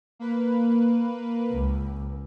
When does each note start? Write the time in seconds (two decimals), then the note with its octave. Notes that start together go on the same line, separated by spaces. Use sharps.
0.19 A#3 B4
1.51 C#2